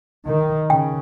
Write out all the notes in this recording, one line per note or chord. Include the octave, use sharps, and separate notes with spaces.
D#3
C#3 G5